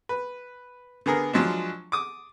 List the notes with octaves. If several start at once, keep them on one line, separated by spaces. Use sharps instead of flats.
B4
D3 B3 G#4 A#4
F3 F#3 G#3 D4
D6 D#6